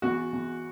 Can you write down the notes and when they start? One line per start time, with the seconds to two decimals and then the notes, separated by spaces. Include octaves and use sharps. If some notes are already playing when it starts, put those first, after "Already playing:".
0.02 E2 F#4
0.33 E2